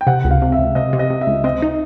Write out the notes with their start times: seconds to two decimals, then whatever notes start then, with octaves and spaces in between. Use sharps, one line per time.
0.01 G5
0.07 C3 F#5
0.25 C#2
0.31 F5
0.42 C3
0.52 E5
0.58 C#2
0.75 C3 D#5
0.93 C3
0.99 D#5
1.10 C3
1.21 E5
1.27 C#2
1.44 C4 D#5
1.62 D#4